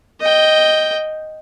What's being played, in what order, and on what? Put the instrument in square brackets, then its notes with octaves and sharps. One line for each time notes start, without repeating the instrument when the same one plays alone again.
[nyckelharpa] D#5 G5